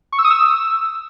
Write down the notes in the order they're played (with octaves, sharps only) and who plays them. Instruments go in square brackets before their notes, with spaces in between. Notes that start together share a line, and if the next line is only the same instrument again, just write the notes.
[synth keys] C#6
E6
D#6
E6